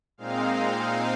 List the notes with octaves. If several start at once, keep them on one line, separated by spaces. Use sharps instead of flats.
A#2 G#3 C4 D#4 F5